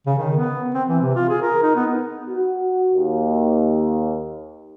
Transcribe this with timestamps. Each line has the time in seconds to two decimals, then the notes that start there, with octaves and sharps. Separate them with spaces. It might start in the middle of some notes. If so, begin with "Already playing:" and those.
0.06 C#3
0.18 D#3
0.37 B3
0.74 C4
0.89 E3
1.02 C3
1.15 F4
1.29 G#4
1.42 A#4
1.63 D#4
1.76 B3
2.29 F#4
2.93 D#2